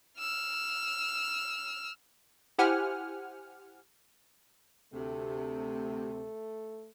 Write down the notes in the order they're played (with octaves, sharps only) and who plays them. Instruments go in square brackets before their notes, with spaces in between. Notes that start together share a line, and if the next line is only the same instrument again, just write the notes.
[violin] E6 F6
[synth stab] E4 G4 C5 F#5 G#5 F6
[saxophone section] D2 C3 [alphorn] A3